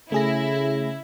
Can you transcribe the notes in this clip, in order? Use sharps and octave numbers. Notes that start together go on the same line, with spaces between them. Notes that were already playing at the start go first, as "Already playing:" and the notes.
C#3 A3 E4 G#4 A#6